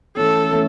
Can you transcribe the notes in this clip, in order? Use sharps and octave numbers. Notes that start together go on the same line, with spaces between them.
E3 A3 C#4 A4
E3 A3 C#4